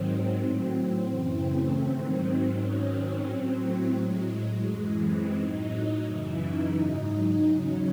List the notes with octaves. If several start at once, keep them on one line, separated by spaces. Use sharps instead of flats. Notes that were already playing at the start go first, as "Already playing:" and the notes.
Already playing: G#2 D#3 F#3 C4
A2 F#3 C4
C4
F#2 C#3 E3
A3
G#2 D#3 F#3 C4
G#2 D#3 F#3 C#4
C4
A2 F#3
A3
A2 F#3 G#3
F#2 E3
C4
A2 F#3 D#4
F#2 C#3 E3 E4
D#4
G#2 F#3 D#4
E2 C#3 F#3 C#4